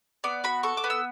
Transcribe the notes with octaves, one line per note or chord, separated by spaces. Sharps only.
B3 D5
F#4 B5
A4 C#6
D6
B3
E6